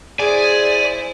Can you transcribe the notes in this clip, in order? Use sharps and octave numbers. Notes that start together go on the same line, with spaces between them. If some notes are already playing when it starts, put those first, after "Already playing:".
E4 G#4 C5 D5 G#5